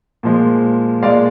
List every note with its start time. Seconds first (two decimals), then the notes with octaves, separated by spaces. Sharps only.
0.23 A#2 F3 G#3
1.03 A#2 G#3 D5 F5